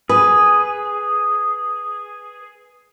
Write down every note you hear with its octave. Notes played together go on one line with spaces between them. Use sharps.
G#4 B4